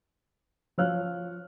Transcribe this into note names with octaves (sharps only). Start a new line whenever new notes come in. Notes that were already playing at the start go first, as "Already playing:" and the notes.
F3 C#5 F5 F6 F#6